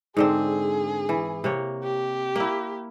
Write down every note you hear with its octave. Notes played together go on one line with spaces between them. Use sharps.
G#2 D3 C4 G#4
E3
C3 A#3 C#5
G4
A#3 E4